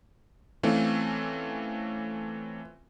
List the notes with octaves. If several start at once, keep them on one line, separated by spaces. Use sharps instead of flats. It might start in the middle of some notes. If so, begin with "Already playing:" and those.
E3 A3 C4 C#4 F4